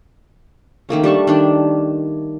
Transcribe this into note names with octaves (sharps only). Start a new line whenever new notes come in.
D#3 A3 A#3 C#4
G3 D4 A5 C#6
D#3 D4